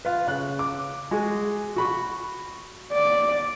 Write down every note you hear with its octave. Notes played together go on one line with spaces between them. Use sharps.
F4 B4
C#3 F#6
D6
G#3 F#4 G#4
F#4 B5 C#6
D5